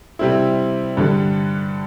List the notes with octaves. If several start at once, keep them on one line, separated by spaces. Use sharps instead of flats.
C3 G3 C4 E4
G2 D3 G3